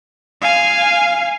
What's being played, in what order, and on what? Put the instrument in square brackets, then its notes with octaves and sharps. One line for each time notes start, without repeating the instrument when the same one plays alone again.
[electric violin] F5 G#5